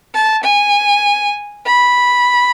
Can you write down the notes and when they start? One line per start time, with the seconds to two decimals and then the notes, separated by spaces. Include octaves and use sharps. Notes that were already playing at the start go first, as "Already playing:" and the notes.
0.14 A5
0.43 G#5
1.66 B5